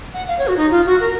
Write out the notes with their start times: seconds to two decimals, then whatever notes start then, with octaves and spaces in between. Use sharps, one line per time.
0.14 F#5
0.28 F5
0.38 C#5
0.48 F#4
0.56 D#4
0.71 F4
0.86 F#4
1.00 A#4